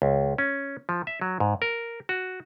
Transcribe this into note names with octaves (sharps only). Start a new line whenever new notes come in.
C#2
C#4
F3
E5
F#3
G#2
A#4
F#4